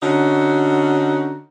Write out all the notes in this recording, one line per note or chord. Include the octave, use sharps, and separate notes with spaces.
D3 C#4 D#4 F#4